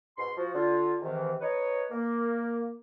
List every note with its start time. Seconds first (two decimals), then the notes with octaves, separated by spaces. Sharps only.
0.18 G#2 B2 C6
0.37 F3 F#4
0.55 D3 F4
1.02 G#2 C3 D#3 E3
1.41 D#4 B4 C#5
1.91 A#3